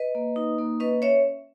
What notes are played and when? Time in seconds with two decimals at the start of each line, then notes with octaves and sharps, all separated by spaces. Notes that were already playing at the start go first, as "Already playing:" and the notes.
Already playing: B4 D#5
0.15 A#3
0.36 D#4
0.59 A#3
0.80 C#4 B4 D#5
1.02 C#4 C#5 E5